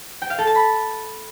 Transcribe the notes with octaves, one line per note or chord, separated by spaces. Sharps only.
G5
F5
A4
A5
B5